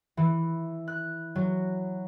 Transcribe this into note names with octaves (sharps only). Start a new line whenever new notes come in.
E3
F#6
F#3